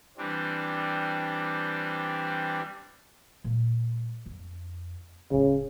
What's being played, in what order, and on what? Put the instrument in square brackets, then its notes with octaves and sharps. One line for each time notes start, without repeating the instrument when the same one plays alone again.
[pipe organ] E3 G3 C4 D4
[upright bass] A#2 G#3
F2
[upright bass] D1 G#3 [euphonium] C#3